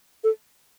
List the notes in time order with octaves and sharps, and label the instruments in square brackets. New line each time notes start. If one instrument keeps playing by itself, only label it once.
[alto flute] A4